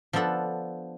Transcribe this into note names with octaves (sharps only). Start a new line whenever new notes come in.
F3 B3 D4 A4 F#5